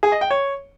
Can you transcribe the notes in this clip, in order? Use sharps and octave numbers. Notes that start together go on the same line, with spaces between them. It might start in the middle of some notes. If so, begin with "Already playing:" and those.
G#4
D#5
G5
C#5